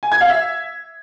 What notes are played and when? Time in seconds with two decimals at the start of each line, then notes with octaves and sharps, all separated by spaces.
0.03 G#5
0.12 G#6
0.21 F5
0.30 E5